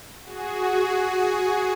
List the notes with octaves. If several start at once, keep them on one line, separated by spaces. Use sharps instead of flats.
F#4 G#4